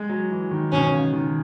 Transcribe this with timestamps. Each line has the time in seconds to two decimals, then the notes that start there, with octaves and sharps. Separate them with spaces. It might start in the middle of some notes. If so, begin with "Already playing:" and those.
Already playing: G#3
0.09 F#3
0.31 E3
0.51 D#3
0.72 B2 C#4
0.93 C#3
1.13 D#3